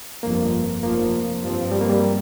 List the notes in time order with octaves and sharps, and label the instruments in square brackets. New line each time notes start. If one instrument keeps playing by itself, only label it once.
[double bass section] G1 F2 F3 [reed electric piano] A#3
[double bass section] F1 F2 F3 [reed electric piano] A#3
[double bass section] G2 F3 C4
[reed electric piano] G3
A#3
G3